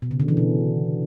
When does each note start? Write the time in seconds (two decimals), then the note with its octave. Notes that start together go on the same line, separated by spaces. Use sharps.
0.02 B2
0.11 C#3
0.20 D3
0.28 E3
0.37 B2